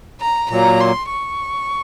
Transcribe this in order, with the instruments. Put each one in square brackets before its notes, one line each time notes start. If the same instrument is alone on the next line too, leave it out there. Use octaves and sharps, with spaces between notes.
[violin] A#5
[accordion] A#2 F#3 A#3 [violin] A#5
[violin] C6
C#6